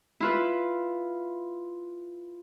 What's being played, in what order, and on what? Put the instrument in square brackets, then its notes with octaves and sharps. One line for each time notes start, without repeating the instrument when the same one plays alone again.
[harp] E4 F4 B4